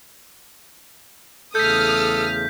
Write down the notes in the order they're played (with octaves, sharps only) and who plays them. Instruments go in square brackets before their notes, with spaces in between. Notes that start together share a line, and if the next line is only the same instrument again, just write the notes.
[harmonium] E2 C#3 A3 [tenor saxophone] A4 [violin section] D#6 F6 [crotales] G6 B6